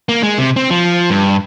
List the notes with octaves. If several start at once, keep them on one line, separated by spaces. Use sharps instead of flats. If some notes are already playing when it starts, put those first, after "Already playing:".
A#3
G#3
C3
C4
F3
G2